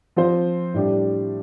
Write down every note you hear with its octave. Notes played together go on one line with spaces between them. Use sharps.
F3 C4 F4 C5
A2 G3 D4 G4